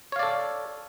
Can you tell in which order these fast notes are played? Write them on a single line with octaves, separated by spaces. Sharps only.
C#5 F5 D5 A4